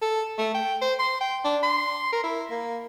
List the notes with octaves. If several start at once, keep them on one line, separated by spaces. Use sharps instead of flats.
A4
A3
G5
C5
C6
G5
D4
C6
A#4
E4
A#3